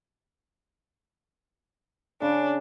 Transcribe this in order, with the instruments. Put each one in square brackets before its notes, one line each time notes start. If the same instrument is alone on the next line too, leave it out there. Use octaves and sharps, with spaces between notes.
[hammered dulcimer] C#3 [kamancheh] D4